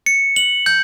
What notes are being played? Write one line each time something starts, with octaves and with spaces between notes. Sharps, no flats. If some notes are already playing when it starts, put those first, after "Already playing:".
C#7
F#7
G6